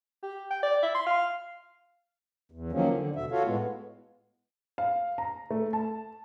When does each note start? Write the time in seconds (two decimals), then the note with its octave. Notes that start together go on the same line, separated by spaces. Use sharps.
0.23 G4
0.50 G5
0.63 D5
0.83 E5
0.95 C6
1.07 F5
2.52 E2
2.72 D#3 F3 F#3 A#3 C#4
2.91 D3
3.16 E2 B2 E5
3.31 F4 F#4 A4 C#5 F5
3.46 A2 G#3 B3
4.78 F5
5.18 A#5
5.50 A3
5.73 A5